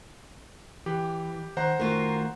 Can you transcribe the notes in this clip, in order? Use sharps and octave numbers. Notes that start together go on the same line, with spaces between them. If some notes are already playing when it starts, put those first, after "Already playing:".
E3 G4
D#3 C5 F#5 A#5
D#3 A3 F4 F#4 A#4